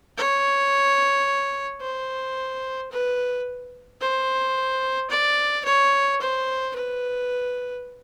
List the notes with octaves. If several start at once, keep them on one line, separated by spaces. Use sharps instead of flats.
C#5
C5
B4
C5
D5
C#5
C5
B4